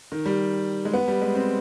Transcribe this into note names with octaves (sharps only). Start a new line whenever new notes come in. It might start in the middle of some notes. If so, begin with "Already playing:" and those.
D#3
G3
G#3
B3
G3
G#3
C4